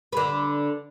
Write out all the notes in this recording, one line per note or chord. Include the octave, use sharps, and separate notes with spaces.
D3 B4